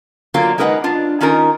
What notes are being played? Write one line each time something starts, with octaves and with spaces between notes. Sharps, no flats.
D3 F#3 A#3 F4 F5
G#3 D#4 A#4 B4 F5 F#5
D4 F4
D#3 C#4 D#4 F4 A#4